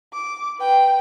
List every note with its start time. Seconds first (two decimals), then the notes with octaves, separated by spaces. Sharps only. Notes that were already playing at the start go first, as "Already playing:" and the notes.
0.14 D6
0.58 B4 G5